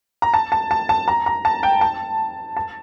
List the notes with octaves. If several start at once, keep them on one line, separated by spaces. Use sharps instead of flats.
A#5
A5
A5
A5
A5
A#5
A#5
A5
G5
A5
A5